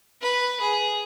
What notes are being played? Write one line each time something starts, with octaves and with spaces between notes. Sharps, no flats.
B4
G#4